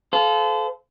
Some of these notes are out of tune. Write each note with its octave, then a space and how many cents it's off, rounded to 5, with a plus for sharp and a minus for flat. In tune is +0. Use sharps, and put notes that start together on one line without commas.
A4 -30 C5 -35 F5 +0